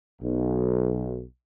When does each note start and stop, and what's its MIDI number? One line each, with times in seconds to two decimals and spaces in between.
0.22 1.22 35